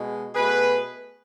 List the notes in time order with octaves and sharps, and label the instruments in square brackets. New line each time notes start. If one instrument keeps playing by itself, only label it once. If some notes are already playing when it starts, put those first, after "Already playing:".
Already playing: [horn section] B2 G#3
B2 A3 G#4 B4